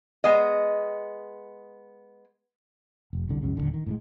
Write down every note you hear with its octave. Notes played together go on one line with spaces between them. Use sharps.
G#3 B3 D#5
F1
C2 D3
C#2 F#2 C#3
D#1 B1 D3
D#3
A2 C#3 G#3